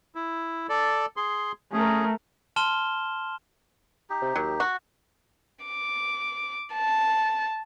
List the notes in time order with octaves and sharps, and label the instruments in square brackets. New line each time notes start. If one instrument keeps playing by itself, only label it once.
[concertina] E4
A4 D5
G#4 C6
[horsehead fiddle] A3 A#4 [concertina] C#4 G#4
[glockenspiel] A5 C6 F6 E7 G7
[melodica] D#4 G4
[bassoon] C3
[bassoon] D#2 [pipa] F#3
[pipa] F#4
[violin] D6
A5